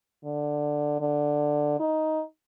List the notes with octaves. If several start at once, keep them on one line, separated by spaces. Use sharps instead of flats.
D3
D3
D#4